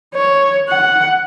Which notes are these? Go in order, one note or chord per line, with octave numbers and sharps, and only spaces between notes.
C#5
F#5